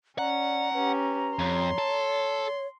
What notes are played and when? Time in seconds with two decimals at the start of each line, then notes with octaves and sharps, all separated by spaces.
0.18 C#4 D5 F#5 A#5
0.74 C#4 G4 B4
1.39 F2 C#5 C6
1.78 A4